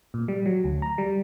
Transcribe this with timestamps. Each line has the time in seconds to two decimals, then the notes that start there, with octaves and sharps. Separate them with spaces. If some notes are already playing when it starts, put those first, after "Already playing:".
0.14 A#2
0.28 G3
0.46 F#3
0.64 D2
0.82 A#5
0.98 G3